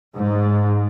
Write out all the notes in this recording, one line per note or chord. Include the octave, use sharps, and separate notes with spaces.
G#2